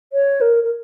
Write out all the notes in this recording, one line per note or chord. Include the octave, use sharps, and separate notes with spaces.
C#5
A#4
A#4